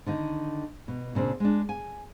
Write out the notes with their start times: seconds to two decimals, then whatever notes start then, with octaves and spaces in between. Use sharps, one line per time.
0.06 D3 D#3 D#4
0.88 B2
1.15 A#2 C#3 C4 D4
1.40 G#3 D4
1.69 G#5